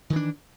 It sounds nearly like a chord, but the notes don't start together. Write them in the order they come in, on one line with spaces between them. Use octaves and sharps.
D#3 E3 D4